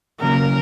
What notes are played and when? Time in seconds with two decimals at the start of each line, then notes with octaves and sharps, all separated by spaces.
0.21 D#2 C#3 F#3 A#3 A#4